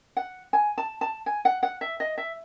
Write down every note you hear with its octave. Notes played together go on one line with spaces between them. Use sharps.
F#5
G#5
A5
A5
G#5
F#5
F#5
E5
D#5
E5